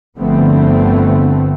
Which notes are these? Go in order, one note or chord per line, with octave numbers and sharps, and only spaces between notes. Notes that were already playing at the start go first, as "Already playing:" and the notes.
G1 D3 F3 A3 B3 C4